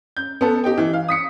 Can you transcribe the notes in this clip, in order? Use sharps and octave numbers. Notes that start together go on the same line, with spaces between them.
G6
B3 A4
G4 D#5 G5
E3
F5
D#6 B6 C#7